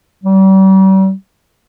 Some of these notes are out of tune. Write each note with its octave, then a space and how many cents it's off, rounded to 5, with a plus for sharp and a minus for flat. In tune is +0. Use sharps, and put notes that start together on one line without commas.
G3 -40